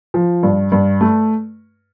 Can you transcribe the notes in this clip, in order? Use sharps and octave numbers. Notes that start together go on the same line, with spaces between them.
F3
G2
G2
A3